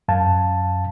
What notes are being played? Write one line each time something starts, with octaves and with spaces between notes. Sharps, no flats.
F#2 F5 A5